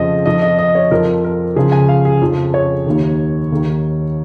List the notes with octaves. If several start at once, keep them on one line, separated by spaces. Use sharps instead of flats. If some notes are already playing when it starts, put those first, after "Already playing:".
Already playing: F2 C#3 F3 D#5
F2 F3 D#5
D#5
D#5
C#5
F2 F3 A#4
A#4
C#2 C#3 F3 G#4
G#5
F5
G#4
F2 C#3 F3
C#5
D#2 D#3
D#2 D#3